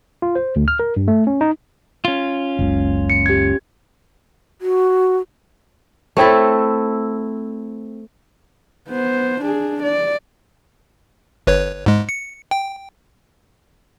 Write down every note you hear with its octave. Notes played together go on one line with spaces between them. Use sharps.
F4
C5
D2
F6
A#4
G2
A3
C#4
D#4
C#4 F4
F#1 C#2
C#7
G4 G#6
F#4
A3 C4 E4 A4
B3 C5
D4 G#4
D5
G1 B4 C#5
G#2 G#3
C#7
G5